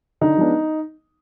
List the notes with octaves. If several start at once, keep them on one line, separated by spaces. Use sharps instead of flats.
D3 D#4
F3 G#3 B3 D4